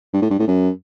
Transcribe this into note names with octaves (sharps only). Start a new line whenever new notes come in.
G2
A2
G2
A2
F#2